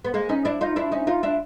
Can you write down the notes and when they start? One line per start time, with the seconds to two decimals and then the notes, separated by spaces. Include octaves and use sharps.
0.05 B3
0.14 G#3 A#3
0.29 C#4 D#4
0.45 D4 E4
0.61 D#4 F4
0.76 D4 E4
0.92 C#4 D#4
1.07 D#4 F4
1.23 D4 E4